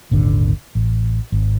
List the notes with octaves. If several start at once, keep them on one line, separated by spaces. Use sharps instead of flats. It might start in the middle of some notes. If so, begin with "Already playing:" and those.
D#1 G#1 D3
A1
G#1